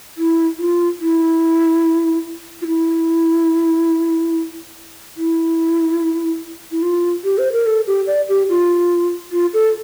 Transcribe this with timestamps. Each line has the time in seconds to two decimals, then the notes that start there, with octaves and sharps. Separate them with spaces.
0.18 E4
0.59 F4
1.01 E4
2.62 F4
2.67 E4
5.17 E4
6.72 E4
6.82 F4
7.24 G4
7.38 C5
7.52 A#4
7.66 A4
7.87 G4
8.07 D5
8.29 G4
8.49 F4
9.32 F4
9.54 A4